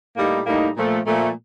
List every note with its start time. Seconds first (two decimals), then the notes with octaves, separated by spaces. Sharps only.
0.15 A2 G3 A#3 D#4
0.45 A2 G3 A#3 D#4
0.75 A#2 F3 A3
1.05 A#2 F3 A3